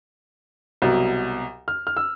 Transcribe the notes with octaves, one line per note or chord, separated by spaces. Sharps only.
C2 B2 F#3
F6
F6
E6